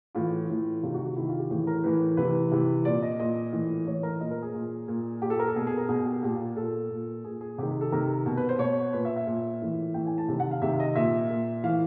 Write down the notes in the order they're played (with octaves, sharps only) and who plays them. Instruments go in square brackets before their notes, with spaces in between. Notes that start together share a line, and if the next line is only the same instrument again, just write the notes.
[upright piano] A2 E3 F4
A2 E3
C3 D#3 F4
F#4
F#4
C3 D#3 E4
F4
G4
A2 E3 G#4
A#4
A2 E3 B4
C3 E3 B4
C3 E3
A#2 D5
D#5
A#2 D#5
A2 E3
A2 E3 C#5
A#4
A#2 D#5
A#4
G#4
A#2
A#2
A#2 G4
A4
A#4
A4
B2 G#4
G#4
A#4
B2 G#4
G4
A#2 G4
F4
A#2 A4
A#2
A#2 G#4
G#4
C3 D#3 G4
A4
C3 D#3 A#4
B2
B4
C5
B2 C#5
A#2 B4
E5
E5
A#2
A2 E3
A2 E3 G5
G#5
A5
C3 D#3
F#5
F5
C3 D#3 E5
D#5
A#2 E5
A#2
A2 E3 F5